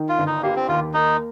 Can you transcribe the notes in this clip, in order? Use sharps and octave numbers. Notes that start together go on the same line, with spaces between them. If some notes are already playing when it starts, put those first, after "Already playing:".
Already playing: D#3
F4
G1
D#4
A#3 G4
C4
D#2 F4
A#3 D#4